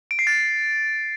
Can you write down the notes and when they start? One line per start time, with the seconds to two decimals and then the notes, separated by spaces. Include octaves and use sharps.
0.11 D7
0.19 C7
0.27 A6